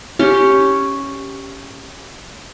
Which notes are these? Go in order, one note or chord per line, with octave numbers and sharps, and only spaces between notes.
C#4 G4